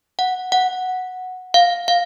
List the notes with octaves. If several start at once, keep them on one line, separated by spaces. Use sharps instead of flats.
F#5
F#5
F5
F5